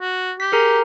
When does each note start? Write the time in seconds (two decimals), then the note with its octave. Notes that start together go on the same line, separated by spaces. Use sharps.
0.01 F#4
0.40 G4 B6
0.52 G#4 A#4 A#5